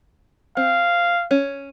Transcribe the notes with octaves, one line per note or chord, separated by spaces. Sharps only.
C4 F5
C#4